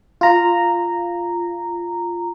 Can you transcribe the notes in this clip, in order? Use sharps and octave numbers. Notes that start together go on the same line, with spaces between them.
F4 A#5